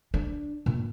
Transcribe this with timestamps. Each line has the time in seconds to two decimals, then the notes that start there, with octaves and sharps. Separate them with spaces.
0.14 D4
0.66 A#2